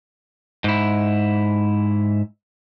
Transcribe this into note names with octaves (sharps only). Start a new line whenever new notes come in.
G#2 E4